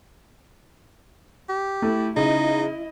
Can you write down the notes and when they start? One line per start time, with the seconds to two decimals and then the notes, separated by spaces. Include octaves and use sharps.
1.49 G4
1.82 A3 E4
2.16 C#3 D#4 E4 D#5